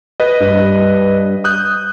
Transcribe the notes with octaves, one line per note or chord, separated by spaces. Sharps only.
B4 D#5
G2
D#6 F#6 G6